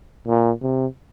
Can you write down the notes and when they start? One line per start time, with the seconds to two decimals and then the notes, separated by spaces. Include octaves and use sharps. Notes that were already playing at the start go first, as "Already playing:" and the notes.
0.27 A#2
0.62 C3